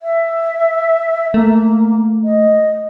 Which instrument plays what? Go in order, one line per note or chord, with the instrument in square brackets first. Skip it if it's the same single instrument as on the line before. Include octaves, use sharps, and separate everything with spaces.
[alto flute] E5
[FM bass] A3 [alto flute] A#3
[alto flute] D#5